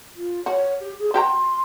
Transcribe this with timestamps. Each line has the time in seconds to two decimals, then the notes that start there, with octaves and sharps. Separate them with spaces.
0.16 F4
0.46 F#4 C#5
0.81 G4
0.99 G#4
1.14 F#4 G5 A#5 C6